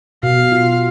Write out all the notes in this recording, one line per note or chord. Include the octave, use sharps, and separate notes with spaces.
B2 F5
F4